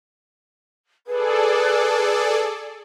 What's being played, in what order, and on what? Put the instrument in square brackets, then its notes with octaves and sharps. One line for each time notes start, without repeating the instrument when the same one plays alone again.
[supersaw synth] G#4 A4 D5 [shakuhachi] B4